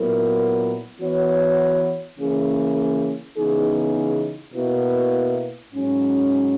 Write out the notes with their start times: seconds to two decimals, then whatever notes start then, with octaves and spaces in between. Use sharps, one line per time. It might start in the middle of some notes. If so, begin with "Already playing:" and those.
Already playing: A#2 F#3 B3 E4 A#4
1.00 E3 B3 F#4 C#5
2.18 C#3 E3 A#3 C#4 G#4
3.37 C#3 E3 B3 D#4 G#4
4.54 B2 A#3 E4 B4
5.72 G#2 F#3 C#4